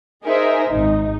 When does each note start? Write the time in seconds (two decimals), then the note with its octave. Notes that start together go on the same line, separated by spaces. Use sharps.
0.24 D#4 G#4 A#4 C5 E5
0.67 G#1 D#4